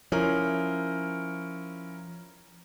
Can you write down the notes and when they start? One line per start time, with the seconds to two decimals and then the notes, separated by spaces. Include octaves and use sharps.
0.12 F3 C#4 E4 A#4